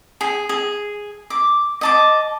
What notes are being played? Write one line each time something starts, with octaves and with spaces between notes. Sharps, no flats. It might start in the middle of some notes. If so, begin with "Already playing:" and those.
G#4
G#4
D6
D#5 A5 D6